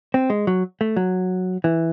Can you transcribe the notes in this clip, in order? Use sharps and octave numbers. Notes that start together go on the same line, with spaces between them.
C4
G#3
F#3
A3
F#3
E3